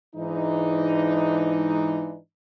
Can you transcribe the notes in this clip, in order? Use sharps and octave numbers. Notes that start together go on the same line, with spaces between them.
G#2 E3 D4 D#4